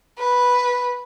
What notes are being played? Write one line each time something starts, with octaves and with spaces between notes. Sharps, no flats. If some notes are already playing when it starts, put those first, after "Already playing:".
B4